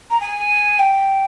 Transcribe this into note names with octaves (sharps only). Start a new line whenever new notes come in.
A#5
G#5
G5